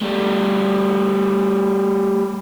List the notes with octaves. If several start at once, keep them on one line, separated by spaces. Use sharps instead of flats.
G3 A3